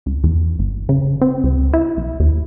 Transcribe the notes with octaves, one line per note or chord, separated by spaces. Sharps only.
C#2
E2
G1
C#3
C4
C#2
E4
B1
D#2